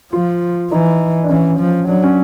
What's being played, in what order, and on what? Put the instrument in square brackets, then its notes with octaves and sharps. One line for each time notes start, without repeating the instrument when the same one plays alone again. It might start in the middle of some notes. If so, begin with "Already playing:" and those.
[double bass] F3 [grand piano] F4
[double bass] E3 [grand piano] D#4
[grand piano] D4
[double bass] E3 [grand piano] C#4
[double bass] F3
[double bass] F#3 [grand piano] D4
[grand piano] C#4